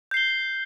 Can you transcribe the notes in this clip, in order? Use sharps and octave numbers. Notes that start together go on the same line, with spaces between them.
G6 C7 G7